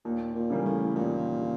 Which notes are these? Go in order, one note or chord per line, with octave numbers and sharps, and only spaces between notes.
D#2 A#2
A#2
C#3 E3 G3 A#3
A2
D#2 A#2
C#3